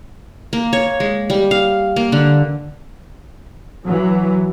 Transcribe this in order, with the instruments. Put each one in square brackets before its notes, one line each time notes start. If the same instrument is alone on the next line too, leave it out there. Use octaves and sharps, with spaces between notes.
[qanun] A#3
C#5
G#3
G3
F5
A#3
D3
[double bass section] E3 F#3